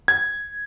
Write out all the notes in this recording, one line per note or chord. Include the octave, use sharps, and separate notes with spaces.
G#6